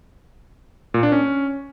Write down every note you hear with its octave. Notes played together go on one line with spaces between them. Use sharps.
A#2
D4
C#4